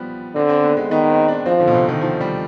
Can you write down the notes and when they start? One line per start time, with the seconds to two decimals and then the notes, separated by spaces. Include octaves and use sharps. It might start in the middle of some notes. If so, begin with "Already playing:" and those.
Already playing: F3 G3 B3
0.35 D3 C4
0.49 C4
0.63 B3
0.77 G#3
0.91 D#3 B3
1.10 C4
1.28 D4
1.46 F3 C4
1.60 D3
1.67 B2
1.74 C3
1.88 D#3
2.01 F3
2.20 G3